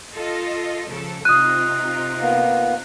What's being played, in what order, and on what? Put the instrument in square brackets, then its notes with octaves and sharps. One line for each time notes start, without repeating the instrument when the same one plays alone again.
[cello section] F4 A4 D#5
C#3 F3 A4
[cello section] C3 D#4 F4 [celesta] D#6 D#7 [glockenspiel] F#6
[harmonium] A#3 B3